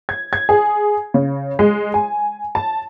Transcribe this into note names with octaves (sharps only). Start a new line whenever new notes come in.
G#6
G#6
G#4
C#3
G#3
G#5
A5